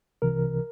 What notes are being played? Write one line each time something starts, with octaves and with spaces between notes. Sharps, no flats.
C2 C3 E3 A#4